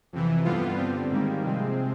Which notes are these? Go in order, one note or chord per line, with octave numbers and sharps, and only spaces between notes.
F2 C3 E3
G2 D3 G3 B3 F4
D3 G3 C4
G#2 D#3 G3 A#3
C3 F3 G#3 C4